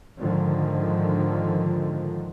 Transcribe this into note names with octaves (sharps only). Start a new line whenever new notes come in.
G#2 D3 D#3 F3